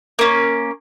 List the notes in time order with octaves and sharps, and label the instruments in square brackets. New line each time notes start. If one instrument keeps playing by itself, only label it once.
[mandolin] A#3 C#4